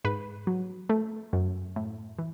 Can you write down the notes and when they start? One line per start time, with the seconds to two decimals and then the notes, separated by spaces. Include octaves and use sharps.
0.04 G#2 B4
0.47 F#3
0.89 A3
1.33 F#2
1.76 A2
2.19 E3